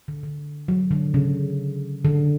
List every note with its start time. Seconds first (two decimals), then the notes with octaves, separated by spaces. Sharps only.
0.08 D3
0.23 D3
0.68 F#3
0.91 D3
1.14 C#3
2.05 D3